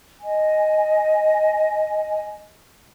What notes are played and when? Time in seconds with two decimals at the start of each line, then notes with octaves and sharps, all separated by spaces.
0.22 D#5 G#5